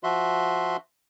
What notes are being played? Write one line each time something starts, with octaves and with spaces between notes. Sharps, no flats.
F3 F#4 E5 C6